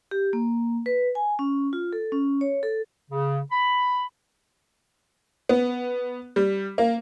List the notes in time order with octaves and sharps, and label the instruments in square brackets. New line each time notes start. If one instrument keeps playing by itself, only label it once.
[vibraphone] G4
A#3
B4
G#5
C#4
F4
A4
C#4
C#5
A4
[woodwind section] C#3
B5
[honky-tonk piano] B3
G3
A#3